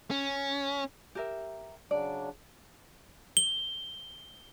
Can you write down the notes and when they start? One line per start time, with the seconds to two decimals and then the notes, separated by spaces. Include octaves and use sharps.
0.11 C#4
1.15 G4 A#4 E5
1.91 C#3 F#3 D4 D5
3.37 G7